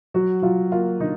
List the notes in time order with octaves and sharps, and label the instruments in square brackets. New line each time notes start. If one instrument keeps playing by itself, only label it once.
[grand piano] F#3 [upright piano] F#4
[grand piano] F#3 [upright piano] F4
[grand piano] A#3 [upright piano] F4
[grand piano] D3 [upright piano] D#4